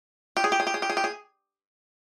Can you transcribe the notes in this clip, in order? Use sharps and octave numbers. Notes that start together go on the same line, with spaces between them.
G4
G#4
G4
G#4
G4
G#4
G4
G#4
G4
G#4